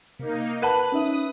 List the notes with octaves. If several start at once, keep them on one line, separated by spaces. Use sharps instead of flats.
C3 A#3 D#4
A#4 B4 F#5 A5 F#6
C#4 D#4 E5 D#6